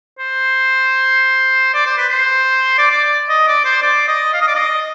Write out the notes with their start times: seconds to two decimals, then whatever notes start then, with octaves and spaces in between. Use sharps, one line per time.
0.19 C5
1.74 D5
1.86 C5
1.98 B4
2.10 C5
2.78 D5
2.91 D5
3.04 D5
3.29 D#5
3.48 D5
3.65 C5
3.82 D5
4.08 D#5
4.34 F5
4.41 D#5
4.47 D5
4.55 D#5